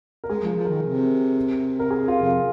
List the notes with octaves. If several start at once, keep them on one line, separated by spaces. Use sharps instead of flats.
A#4
G#3 G#4
F3 G#4
F3
D#3 A#4
C3
A#4
G#4
F4
F2